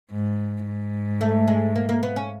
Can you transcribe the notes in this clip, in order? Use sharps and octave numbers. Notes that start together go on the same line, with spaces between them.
G#2
G#2
A3
G#3
A#3
A#3
B3
C#4